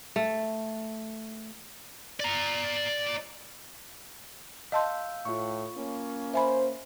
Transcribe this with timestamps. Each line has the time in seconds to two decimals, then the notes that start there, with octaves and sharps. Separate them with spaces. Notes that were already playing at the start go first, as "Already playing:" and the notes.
0.16 A3
2.20 D5 A#5
4.72 D#5 F5 A5 C6 E6 G6
5.25 A2 F4 C#6
5.77 A#3 C#4
6.34 C5 E5 G#5 B5